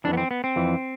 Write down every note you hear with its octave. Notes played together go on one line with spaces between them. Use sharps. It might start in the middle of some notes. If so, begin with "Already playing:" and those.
F2 E3 D4
B3
C4
B3
C4
F2 E3